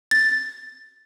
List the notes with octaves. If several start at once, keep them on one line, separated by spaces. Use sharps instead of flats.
A6